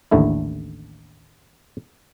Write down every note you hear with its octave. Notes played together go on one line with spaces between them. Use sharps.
A1 D#2 D3 A3 E4